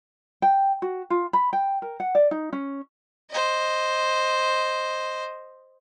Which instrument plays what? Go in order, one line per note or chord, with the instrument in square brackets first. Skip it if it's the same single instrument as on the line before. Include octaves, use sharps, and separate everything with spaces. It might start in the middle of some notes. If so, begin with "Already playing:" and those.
[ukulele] G5
F#4
F4
B5
G5
A#4
F#5
D5
D#4
C#4
[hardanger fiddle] C5 D#5